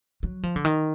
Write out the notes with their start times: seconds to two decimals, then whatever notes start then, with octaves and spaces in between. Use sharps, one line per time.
0.23 F#3
0.43 F3
0.56 D3
0.65 D#3